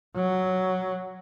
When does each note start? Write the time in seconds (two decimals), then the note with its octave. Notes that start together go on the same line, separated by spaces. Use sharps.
0.16 F#3